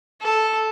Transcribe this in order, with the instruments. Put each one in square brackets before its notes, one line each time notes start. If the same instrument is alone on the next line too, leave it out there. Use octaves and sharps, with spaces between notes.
[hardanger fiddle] A4